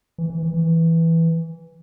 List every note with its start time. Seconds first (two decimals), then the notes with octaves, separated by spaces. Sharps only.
0.18 E3
0.30 E3
0.43 E3
0.54 E3